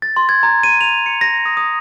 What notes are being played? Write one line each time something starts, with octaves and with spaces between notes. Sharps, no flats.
A6
C6
G#6
A#5
D#7
F7
C#7
A#6
D#6
D#6